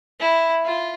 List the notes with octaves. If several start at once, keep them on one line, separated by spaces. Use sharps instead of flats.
E4
F4